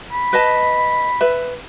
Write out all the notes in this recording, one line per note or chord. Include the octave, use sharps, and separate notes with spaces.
B5
B4 D#5 A5
B4 E5